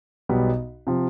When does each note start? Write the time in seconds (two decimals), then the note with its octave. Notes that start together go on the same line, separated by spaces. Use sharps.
0.29 B1 B2 G3 B3
0.87 C3 F3